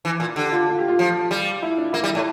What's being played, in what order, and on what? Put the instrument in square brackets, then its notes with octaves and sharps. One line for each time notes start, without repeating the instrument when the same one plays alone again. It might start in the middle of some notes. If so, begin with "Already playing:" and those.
[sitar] E3
A#2
[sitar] D3 [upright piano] G4
[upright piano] F4
F4
G4
F4
[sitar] F3
G3
[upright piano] E4
D4
[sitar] A#3 [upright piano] E4
[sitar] G3
[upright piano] E4
[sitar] A2